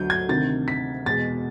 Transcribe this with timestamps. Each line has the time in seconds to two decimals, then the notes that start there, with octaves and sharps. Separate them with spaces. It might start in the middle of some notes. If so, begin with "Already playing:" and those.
Already playing: D2 D3 F#3 G6
0.10 G#6
0.29 D2 C3 D#3 A6
0.68 B6
1.06 E2 B2 G#3 A6